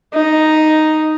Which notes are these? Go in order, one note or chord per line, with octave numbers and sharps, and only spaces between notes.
D#4